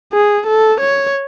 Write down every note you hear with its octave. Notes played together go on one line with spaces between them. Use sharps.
G#4
A4
C#5